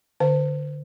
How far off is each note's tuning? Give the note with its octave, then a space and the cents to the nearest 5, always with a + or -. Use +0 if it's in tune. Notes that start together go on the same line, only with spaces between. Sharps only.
D3 +0 C5 -30